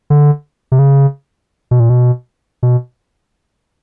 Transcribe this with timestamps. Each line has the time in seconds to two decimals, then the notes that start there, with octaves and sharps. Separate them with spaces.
0.10 D3
0.72 C3
0.79 C#3
1.71 B2
1.80 A#2
1.89 B2
2.63 B2